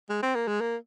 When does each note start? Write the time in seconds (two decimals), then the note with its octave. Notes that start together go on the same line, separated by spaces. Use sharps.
0.09 G#3
0.22 C4
0.35 A#3
0.48 G#3
0.61 A#3